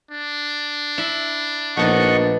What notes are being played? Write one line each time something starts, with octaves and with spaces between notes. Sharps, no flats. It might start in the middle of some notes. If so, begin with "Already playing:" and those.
D4
E4 E5
A#1 A3 B3 D#4 D#5 F#5 C#6